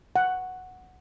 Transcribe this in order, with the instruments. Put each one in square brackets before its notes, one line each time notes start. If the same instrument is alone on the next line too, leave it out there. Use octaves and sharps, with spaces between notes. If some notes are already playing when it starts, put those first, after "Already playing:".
[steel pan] F#5